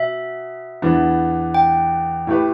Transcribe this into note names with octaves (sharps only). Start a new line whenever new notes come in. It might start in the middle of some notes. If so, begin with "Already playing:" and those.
Already playing: B2 E5
E2 E3 B3 D4
G5
A2 A3 E4 G4 B4